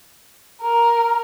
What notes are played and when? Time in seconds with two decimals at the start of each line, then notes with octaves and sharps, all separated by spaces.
0.62 A#4